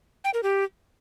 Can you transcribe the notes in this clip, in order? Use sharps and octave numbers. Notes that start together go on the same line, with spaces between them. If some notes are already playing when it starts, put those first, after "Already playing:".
G5
A#4
G4